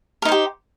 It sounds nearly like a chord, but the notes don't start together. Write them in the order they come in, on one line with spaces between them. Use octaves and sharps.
A#4 D#4 C5 G4